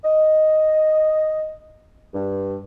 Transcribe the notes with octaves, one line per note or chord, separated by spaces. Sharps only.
D#5
G2